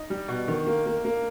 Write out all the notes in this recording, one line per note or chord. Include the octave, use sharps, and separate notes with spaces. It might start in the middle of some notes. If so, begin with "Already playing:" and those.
Already playing: D#4
G3
B2
D#3
A#3
A#3
A#3